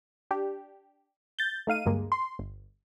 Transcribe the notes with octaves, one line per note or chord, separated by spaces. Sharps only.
D4 G4
G6 A6
A3 D#4 F5 D#7
D2 G2 G#3 A#3
C6
G1